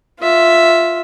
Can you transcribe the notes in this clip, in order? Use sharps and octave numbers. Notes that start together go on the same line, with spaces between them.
F4 E5